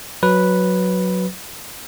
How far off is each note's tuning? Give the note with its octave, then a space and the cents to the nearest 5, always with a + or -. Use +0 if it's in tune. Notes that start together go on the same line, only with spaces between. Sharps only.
F#3 -5 B4 -5